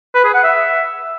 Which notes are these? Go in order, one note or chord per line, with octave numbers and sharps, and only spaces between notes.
B4
G#4
F#5
E5